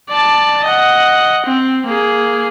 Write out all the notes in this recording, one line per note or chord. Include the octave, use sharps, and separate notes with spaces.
D5 A5
D#5 F#5
C4
A#3 G#4